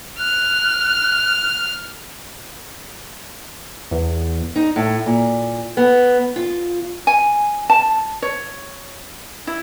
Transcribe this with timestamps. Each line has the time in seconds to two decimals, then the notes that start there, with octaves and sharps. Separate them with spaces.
0.19 F6 F#6
3.91 E2
4.56 D#4
4.76 A2
5.06 A#2
5.77 B3
6.36 F4
7.07 G#5
7.70 A5
8.22 C#5
9.47 E4